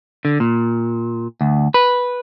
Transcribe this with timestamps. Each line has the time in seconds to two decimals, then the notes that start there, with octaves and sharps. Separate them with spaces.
0.25 D3
0.40 A#2
1.41 D2
1.74 B4